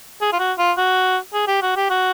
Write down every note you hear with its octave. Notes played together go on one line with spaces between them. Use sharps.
G#4
F4
F#4
F4
F#4
G#4
G4
F#4
G4
F#4